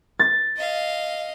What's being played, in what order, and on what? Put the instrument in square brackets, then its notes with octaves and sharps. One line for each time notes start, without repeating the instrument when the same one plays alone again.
[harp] A6
[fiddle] D#5 F5